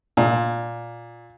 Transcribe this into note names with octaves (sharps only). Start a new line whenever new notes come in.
A#2